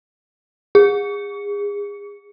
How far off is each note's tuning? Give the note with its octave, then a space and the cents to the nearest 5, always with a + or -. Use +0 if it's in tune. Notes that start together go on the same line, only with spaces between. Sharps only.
G#4 -30